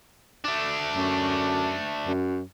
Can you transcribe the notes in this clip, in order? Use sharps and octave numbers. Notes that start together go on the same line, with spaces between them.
A3 D4
F#2
F#2